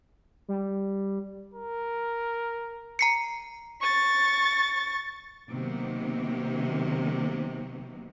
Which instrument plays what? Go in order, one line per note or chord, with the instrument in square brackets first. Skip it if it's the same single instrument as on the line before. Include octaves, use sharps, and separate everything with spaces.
[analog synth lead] G3
[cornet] A#4
[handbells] A#5 C7 C#7
[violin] C#6 A6
[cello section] C3 D#3 F#3 A#3 B3